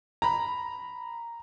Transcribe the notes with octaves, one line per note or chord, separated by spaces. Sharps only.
A#5 B5